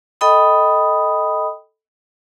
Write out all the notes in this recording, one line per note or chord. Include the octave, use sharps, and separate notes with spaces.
A4 D#5 G5 B5 D#6